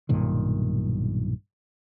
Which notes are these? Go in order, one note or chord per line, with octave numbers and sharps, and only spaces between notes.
B1 G2 A#2 D#3